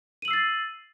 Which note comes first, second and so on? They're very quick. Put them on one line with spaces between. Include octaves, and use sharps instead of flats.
D#7 F#7 E6 C7 A6